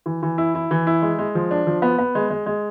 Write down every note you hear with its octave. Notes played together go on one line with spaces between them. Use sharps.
E3
E3
E4
E4
E3
E4
G#3
G#3
F3
D4
F3
B3
B3
G#3
G#3
G#3